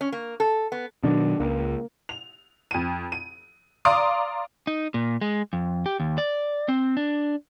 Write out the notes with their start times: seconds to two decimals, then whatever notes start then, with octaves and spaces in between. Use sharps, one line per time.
0.01 C#4
0.12 A#3
0.40 A4
0.72 B3
1.03 B2 D#3 F#3 D4
1.39 C#2 A#3
2.09 F7
2.71 F2 D#7
3.12 D#7
3.85 D5 F5 A#5 C6 D6 D#6
4.67 D#4
4.94 A#2
5.21 G#3
5.53 F2
5.86 G4
6.00 D#2
6.18 D5
6.69 C4
6.97 D4